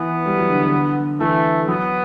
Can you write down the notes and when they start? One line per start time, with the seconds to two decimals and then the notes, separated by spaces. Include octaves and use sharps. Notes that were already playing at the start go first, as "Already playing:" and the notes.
Already playing: E3 B3
0.26 G3
0.38 F#3
0.50 D3
0.62 D3
1.20 E3 A3
1.68 F#3 B3